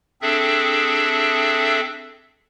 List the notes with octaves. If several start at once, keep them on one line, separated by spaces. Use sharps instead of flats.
C4 D4 G#4 A4 E5